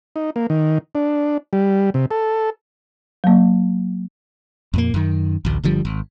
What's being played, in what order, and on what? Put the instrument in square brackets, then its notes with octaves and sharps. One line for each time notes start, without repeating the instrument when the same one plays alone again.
[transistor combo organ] D#4
A#3
D#3
D4
G3
C3
A4
[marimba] F#3 A#3
[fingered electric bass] F2 A#2 A#3
F#2 D#3
A1 D2
G1 D3 F3 G3
G#1